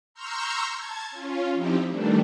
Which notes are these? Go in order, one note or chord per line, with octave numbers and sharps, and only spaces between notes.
A#5 C6 C#6 E6 F6 G6
A5 G#6
C#4 F4
F3 C4 D#4 E4 G4
D#3 E3 G3 A3 D4